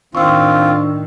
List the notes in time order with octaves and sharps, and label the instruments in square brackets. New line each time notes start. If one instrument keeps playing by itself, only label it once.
[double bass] A2 D#3 [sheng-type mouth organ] C4 F4 [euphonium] D4 [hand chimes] C#6 E6